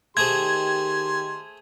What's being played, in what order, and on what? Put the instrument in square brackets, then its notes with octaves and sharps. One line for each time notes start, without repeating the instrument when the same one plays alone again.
[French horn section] D#3 G4 [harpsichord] A3 G#4 C5 [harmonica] C6 [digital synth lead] G#6